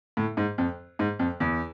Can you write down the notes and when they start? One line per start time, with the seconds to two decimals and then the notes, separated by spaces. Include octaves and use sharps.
0.17 A2
0.37 G#2
0.58 F2
0.99 G#2
1.19 F2
1.40 E2